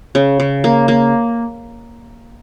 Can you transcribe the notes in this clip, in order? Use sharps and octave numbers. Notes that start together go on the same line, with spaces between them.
C#3
C#3
A#3
A#3